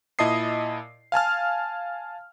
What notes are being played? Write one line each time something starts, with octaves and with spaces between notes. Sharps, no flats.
A#2 E4 D#5 A5 D#6 C7
F5 G#5 A5 F6